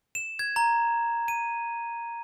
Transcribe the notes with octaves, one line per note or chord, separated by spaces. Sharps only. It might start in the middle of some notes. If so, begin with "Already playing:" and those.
E7
G#6
A#5
D#7